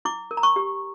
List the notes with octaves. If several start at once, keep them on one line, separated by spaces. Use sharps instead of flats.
E4 D6
A#4
A#5
C#6
G4